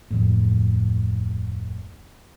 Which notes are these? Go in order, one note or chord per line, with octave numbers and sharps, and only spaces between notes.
D1 F2 A2